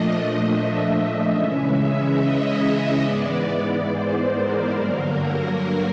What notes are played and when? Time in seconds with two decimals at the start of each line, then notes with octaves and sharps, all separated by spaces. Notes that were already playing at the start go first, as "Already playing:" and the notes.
Already playing: A#2 F3 A3 D4 D#5
0.45 E5
0.87 E5
1.30 C#3 E3 G#3 C#4
2.15 D#5
3.01 G#2 E3 G#3 B3 D5
3.86 C5
4.28 A#4
4.71 G2 D3 F#3 A#3 A#4
5.57 A#4